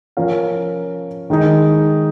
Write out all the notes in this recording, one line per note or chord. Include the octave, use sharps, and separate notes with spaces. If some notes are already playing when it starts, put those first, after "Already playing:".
F3 C#4 A#4 F5
D#3 G#3 D#4